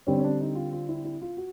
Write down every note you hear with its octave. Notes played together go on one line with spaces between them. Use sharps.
D3 G3 C4 C#4
C#4
D4
D#4
F4
F4
E4
E4
F4
F#4